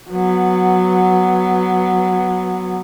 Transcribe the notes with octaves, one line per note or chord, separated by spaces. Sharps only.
F#3 B3